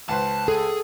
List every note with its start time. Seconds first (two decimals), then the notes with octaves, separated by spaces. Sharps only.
0.09 C#2 B4 C5 A5
0.48 G#4 A4